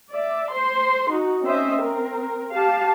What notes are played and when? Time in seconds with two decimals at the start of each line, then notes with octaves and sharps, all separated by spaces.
0.11 D5 E5
0.54 C5 C6
1.11 D#4 F#4
1.42 C4 C#4 C5 D#5 E5
1.77 C4 A#4
2.52 G4 F5 A5